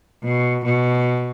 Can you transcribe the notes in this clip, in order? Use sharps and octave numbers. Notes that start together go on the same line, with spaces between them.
B2
B2